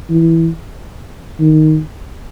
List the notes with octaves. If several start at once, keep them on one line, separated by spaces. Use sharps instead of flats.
E3
D#3